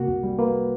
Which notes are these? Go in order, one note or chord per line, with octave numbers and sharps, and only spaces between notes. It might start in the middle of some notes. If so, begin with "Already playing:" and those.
Already playing: C3 A#3 F#4
C2
G3
A#3 B4